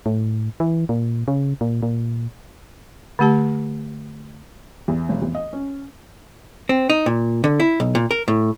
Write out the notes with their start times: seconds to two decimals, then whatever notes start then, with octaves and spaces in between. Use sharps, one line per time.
0.06 A2
0.60 E3
0.89 A#2
1.28 C#3
1.61 A#2
1.83 A#2
3.19 D3 A3 G4 A5
4.88 E2
5.09 F1
5.22 E2
5.35 D#5
5.53 C#4
6.69 C4
6.90 D#4
7.06 A#2
7.44 D3
7.60 E4
7.80 B1
7.95 A#2
8.11 A#4
8.28 A2